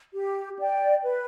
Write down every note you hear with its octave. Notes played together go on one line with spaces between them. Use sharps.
G4
D5 G5
B4